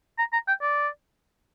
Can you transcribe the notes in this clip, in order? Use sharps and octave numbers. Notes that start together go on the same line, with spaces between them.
A#5
A#5
G5
D5